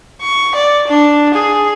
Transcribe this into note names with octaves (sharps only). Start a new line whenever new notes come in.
C#6
D5
D4
G#4